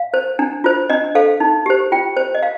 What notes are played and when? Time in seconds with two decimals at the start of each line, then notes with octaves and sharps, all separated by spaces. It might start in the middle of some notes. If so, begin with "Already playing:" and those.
Already playing: F5
0.14 C5
0.39 D4
0.64 F4 C5
0.90 D4 D#5
1.15 A4 C5 F5
1.40 D#4
1.66 G4 C5
1.92 F4 G5
2.17 C5
2.35 D#5
2.43 F5